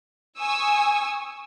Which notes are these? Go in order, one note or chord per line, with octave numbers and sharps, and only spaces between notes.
G#5 C#6 D#6 E6